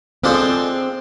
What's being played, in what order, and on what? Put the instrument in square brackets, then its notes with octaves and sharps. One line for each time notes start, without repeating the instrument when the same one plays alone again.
[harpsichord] F3 G#3 D4 A4 C5 [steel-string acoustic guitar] C4